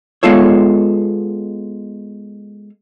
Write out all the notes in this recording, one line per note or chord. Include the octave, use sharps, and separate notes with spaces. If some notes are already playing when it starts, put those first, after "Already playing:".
G#3 B3 F4 A4 C#5